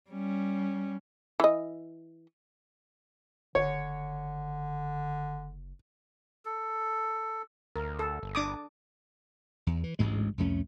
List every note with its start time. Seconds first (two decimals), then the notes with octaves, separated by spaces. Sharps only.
0.11 G3 C#4
1.40 E3 D#5
3.55 F#1 D3 C#5
6.45 A4
7.76 D2 A#4
7.99 A4
8.23 G1
8.35 D4 D6 D#6
9.67 E2
9.84 E3
9.99 A1 D2 G#2 G#3
10.38 C2 F2 A3 C#4